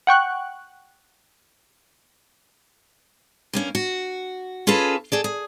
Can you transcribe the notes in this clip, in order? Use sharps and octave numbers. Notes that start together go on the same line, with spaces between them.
F#5 G5 C#6 F#6
G2 A#3 C#4
F#4
C#4 F4 G#4 A4 B4
G#4 A4 D5
G#4